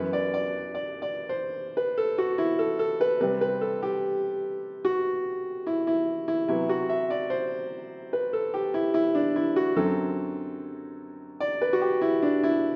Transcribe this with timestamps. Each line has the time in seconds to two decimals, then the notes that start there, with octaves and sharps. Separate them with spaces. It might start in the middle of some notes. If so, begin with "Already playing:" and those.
Already playing: F#2 E3 B3 B4
0.13 D5
0.34 D5
0.75 D5
1.02 D5
1.29 C5
1.77 B4
1.98 A4
2.18 F#4
2.38 E4
2.59 A4
2.79 A4
3.01 B4
3.20 C3 G3 C4 B4
3.41 B4
3.61 A4
3.82 G4
4.85 F#4
5.67 E4
5.87 E4
6.28 E4
6.48 C3 F#3 B3 E4
6.69 F#4
6.89 E5
7.10 D5
7.30 C5
8.13 B4
8.33 A4
8.54 G4
8.74 E4
8.94 E4
9.15 D4
9.36 E4
9.56 F#4
9.76 F#2 D3 F#3 C4 A4
11.40 D5
11.61 B4
11.73 F#4
11.81 G4
12.01 E4
12.22 D4
12.43 E4